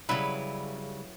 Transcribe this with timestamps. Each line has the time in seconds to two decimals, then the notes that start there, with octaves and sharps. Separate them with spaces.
0.09 C#3 F#3 G3 E4 B4